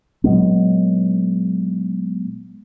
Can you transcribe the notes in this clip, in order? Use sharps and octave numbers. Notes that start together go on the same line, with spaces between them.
A#2 F#3 G#3 B3